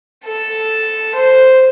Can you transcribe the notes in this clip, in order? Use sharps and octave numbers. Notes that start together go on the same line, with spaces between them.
A4
C5